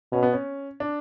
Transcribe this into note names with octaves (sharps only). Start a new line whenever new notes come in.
B2 C#4
B3
C#4
D4